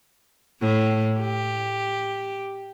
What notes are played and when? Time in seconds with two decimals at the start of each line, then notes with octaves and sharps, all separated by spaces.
0.61 A2
1.20 G4